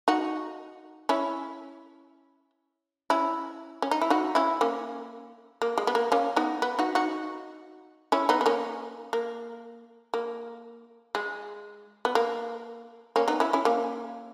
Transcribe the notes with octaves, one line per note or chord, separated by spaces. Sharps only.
D#4 F#4
C#4 E4
C#4 E4
C#4
D#4
E4
D#4 F#4
C#4 E4
A#3 C#4
A#3
G#3
B3
A#3
A#3 C#4
B3 D#4
B3
D#4 F#4
D#4 F#4
C#4 E4
B3 D#4
B3
A#3 C#4
A#3
A#3
G#3
B3
A#3
A#3 C#4
B3 D#4
C#4 E4
C#4 E4
A#3 C#4